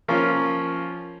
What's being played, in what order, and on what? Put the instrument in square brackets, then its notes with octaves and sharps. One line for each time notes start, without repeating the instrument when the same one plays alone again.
[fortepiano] F3 A#3 C#4 F4